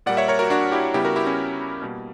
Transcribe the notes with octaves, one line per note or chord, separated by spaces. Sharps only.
A#2 G3 A#3 D5 F#5
C#5 E5
A#4 C#5
F#4 A#4
D4 F#4
E4 G4
C#3 G3 B3 E4 G4
F#4 A#4
E4 G4
C#4 E4
B2 G3 A#3